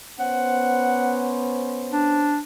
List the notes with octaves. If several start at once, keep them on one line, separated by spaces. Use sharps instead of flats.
B3 C#4 C5 F#5
D4